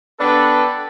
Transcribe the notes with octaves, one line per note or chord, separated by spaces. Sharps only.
D3 B3 D4 G4 A4 B4